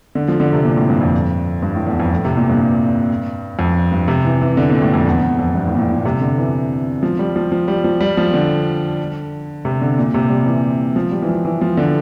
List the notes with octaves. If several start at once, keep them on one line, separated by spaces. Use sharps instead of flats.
D3
F3
D3
C3
A#2
A2
G2
F2
G2
A2
E2
F2
A2
C3
A#2
G2
F2
G2
C3
E3
E3
D3
A#2
A2
F2
E2
E2
F2
G2
A2
A#2
A2
A#2
C3
D3
E3
F3
G3
F3
F3
G3
F3
G3
F3
D3
C3
D3
A#2
C3
G3
E3
F3
G3
E3
F3
E3
F3
D3